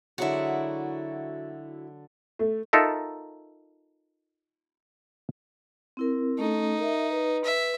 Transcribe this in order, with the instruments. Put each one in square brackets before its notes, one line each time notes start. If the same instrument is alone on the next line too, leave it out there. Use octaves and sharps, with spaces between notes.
[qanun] D3 F#3 G#3 [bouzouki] E4 F#4
[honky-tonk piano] A3
[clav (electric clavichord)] D#4 F4 A4 A#4 E5
[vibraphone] C4 E4 A#4
[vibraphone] A3 C#4 A4 [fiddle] D#4
[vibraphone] A#4 E5
B4
[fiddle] E5